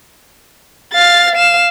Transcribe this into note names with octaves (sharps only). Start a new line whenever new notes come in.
F5 A6
F5 E7